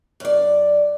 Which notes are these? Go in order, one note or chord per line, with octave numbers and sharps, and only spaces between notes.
F#2 D5